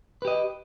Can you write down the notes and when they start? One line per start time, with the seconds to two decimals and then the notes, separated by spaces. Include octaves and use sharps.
0.22 B4
0.25 G4
0.28 D#5